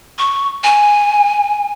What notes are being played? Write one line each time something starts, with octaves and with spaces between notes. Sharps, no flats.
C#6
G#5